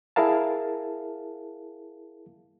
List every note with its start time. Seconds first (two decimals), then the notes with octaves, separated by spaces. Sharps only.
0.16 E4 G#4 A#4 F5 A5